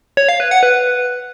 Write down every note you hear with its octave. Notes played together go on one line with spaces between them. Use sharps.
C#5
F5
B4
F#5
B4